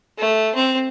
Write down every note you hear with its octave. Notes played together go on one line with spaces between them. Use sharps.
A3
C4